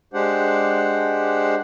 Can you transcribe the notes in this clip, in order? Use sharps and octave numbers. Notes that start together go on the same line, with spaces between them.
G#3 D4 G4 C5 F#5